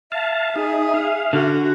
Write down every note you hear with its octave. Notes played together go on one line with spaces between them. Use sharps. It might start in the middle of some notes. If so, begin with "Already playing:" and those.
E5 F5 A5
D#4 G#4
F5
D3 F#4